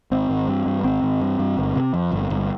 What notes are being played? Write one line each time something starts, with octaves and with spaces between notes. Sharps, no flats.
G#1 C4
G#1
G2
G2
G#1 C4
G#1
G2
G2
G1
C3
F2
G1
G1